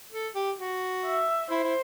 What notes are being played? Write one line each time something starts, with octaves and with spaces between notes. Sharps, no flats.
A4
G4
F#4
E5
E4 C5
E4